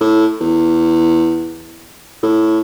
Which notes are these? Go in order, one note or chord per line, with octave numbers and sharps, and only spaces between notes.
A2
E2
A2